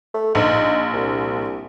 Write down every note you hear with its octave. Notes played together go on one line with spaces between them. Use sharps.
A3
A#1 D#4
C2